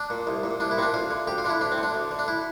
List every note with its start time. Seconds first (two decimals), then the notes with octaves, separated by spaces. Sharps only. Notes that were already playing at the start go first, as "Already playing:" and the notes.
Already playing: D4
0.10 A#2
0.27 C2
0.43 A#2
0.60 C2 D4
0.71 E4
0.77 A#2 C4
0.82 D4
0.94 D2 F4
1.11 D3
1.27 D2 G4
1.38 F4
1.44 D3 D4
1.49 E4
1.61 D2 D4
1.72 C4
1.78 D3
1.83 D4
1.94 D2
2.11 D3
2.19 D4
2.28 E4